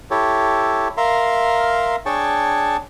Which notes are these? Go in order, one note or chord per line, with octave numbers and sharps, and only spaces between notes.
E4 G4 A4 C#5
A#4 E5 F5 A#5 C6
D4 G#4 C#5 G5 A5 C#6